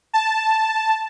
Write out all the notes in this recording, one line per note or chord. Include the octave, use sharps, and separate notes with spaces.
A5